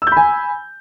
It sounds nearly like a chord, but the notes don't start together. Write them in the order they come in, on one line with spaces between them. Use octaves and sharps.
E6 G6 B5 G#5